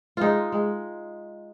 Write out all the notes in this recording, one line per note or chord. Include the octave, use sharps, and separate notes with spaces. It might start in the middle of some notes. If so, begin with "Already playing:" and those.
G#3 D#4 F4
G#3